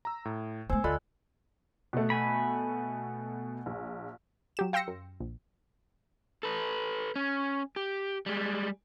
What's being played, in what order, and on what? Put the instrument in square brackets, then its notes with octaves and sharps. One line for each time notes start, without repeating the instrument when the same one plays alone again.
[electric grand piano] A#5 E6
A2
[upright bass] A3 B3 [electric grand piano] C5 [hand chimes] G#5 E6
[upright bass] D2 [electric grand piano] F4 A4 B5 [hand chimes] D5 D#5 F#6
[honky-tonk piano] B2 A3
[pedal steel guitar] G#5 B5
[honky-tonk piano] A#1
[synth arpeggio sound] F#3 G4 E7
F5 G5 C6 E6 A#6 C#7
F#2
A#1
[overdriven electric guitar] A4 B4
C#4
G4
G3 G#3